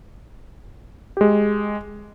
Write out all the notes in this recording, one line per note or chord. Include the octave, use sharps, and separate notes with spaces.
G#3 G4